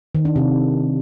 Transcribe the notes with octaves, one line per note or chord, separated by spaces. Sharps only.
D#3
D4
C3